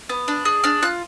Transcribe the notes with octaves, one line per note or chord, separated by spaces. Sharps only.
B3
D4
G#4
D4 F6
F4 F#6